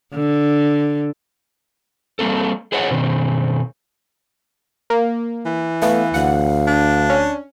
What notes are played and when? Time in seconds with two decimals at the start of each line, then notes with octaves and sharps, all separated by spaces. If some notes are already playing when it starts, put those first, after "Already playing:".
0.15 D3
2.19 G3 A#3 C4 A4
2.72 G#4 B4 C#5 D#5 F#5
2.91 B2 D#3 C4
4.90 A#3
5.45 E3
5.82 A3 B3 F5
6.14 D2 F5 F#5
6.67 D4
7.10 C#4